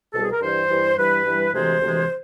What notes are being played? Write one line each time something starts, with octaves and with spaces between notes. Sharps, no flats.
C2 B2 G3 A4
G#4
A#4
G2 E3 G3 C5
G2 E3 G3
G2 E3 G3 B4
G2 E3 G3
D2 C3 E3 G#3 C5
D2 C3 E3 G#3